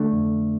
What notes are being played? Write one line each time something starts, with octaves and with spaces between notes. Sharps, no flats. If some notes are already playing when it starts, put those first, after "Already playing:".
Already playing: D3 A3 D4
F2